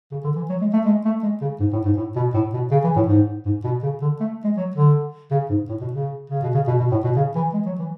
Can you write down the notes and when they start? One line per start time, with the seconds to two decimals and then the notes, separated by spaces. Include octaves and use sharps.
0.12 C#3
0.24 D3
0.36 E3
0.49 F#3
0.61 G#3
0.73 A3
0.85 G#3
1.05 A3
1.23 G#3
1.41 C#3
1.60 G#2
1.73 A2
1.85 G#2
1.97 A2
2.16 B2
2.34 A2
2.53 B2
2.71 C#3
2.84 E3
2.96 A2
3.08 G#2
3.46 G#2
3.64 B2
3.83 C#3
4.02 D3
4.20 A3
4.44 G#3
4.57 F#3
4.75 D3
5.31 C#3
5.50 G#2
5.69 A2
5.81 B2
5.93 C#3
6.30 C#3
6.43 B2
6.54 C#3
6.68 B2
6.80 B2
6.91 A2
7.04 B2
7.16 C#3
7.35 E3
7.53 G#3
7.66 F#3
7.79 E3